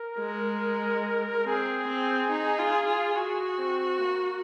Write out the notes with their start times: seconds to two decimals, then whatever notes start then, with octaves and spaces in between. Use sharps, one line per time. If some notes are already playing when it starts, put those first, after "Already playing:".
Already playing: A#4
0.20 G#3
1.46 C4 G#4
1.88 C4
2.31 D#4
2.58 F4
2.87 F4
3.15 F#4 G#4
3.58 C4
3.99 A#3